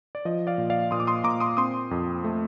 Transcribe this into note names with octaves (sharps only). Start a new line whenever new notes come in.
D5
F3 D#5
D5 F5
A#2
D5 F5
A#2 C6 D#6
D6
C6 D#6
A#2 A#5 D6
C6 D#6
C4 C6 D#6
F2
A3